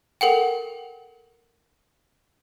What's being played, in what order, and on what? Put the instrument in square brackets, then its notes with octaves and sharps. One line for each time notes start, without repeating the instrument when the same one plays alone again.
[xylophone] A4 A#4 F#5 G5